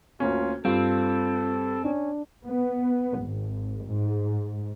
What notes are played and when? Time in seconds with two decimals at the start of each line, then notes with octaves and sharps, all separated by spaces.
0.20 D2 A#3 C#4 F4
0.65 G2 C4 F4 A4
1.84 C#4 D4
2.46 B3
3.20 G#1
3.86 G#2